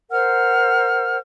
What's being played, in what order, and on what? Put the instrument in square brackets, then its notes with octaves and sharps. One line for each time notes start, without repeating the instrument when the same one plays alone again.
[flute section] A#4 C5 F#5 F6